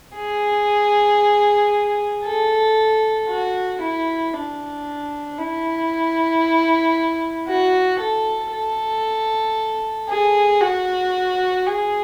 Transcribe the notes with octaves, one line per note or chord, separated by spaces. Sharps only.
G#4
A4
F#4
E4
D4
E4
F#4
A4
A4
G#4
F#4
G#4